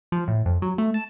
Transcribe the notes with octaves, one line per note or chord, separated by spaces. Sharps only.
F3
A2
F2
F#3
A3
A5